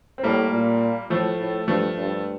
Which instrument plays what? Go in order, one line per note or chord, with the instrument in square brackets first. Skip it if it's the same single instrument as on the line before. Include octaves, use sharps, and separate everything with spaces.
[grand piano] C4
[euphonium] A2 [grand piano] G3 A#3
[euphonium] A#2
[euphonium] A2 [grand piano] F3 A3
[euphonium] A2
[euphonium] G2 [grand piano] F3 A3
[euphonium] G2